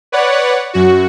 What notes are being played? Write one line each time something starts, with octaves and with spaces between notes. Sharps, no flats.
B4 C#5 D5 F#5
F#2 F#4